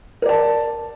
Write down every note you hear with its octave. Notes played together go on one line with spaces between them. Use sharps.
A#4 D5 A5